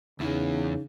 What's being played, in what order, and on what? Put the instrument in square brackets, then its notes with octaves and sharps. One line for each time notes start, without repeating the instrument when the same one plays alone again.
[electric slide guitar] E2 E3 [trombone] C#3 [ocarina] D#4